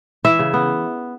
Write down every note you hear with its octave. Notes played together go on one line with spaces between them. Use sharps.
E3 E5
C#3
B3